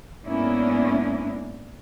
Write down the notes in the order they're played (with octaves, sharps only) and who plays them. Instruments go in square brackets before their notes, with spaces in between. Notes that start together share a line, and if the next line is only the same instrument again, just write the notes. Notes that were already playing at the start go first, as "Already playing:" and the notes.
[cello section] G#2 A#3 B3 C#4 D4 E4